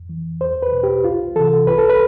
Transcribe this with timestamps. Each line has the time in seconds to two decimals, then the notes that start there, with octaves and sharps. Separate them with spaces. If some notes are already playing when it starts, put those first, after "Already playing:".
Already playing: F2
0.09 E3
0.41 E2 C5
0.62 B4
0.73 B2
0.83 G4
1.04 C2 F4
1.36 C3 E3 A4
1.67 C2 B4
1.78 A4
1.89 B4